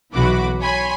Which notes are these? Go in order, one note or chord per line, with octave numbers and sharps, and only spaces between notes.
B1 E3 F#4 B5 D6
C#5 G#5 B5 C6